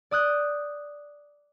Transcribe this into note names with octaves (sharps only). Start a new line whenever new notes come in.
D5 D#6 F#6 G6